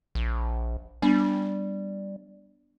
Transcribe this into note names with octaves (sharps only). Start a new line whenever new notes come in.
A#1
G3 B3 D4